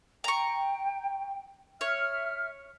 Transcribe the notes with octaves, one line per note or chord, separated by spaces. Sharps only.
G5 A#5 C#6
C#5 E5 F6